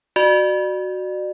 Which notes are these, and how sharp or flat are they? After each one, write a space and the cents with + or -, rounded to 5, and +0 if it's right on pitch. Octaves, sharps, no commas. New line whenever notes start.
F#4 +0 D5 +35